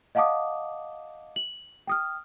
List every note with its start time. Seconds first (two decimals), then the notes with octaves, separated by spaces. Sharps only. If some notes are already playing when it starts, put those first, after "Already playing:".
0.15 D#5 F5 F#5 A5 D6 D#6
1.36 F#7
1.87 G5 D#6 F6